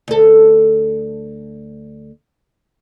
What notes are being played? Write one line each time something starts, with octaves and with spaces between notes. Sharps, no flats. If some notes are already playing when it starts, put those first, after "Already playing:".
D2 A4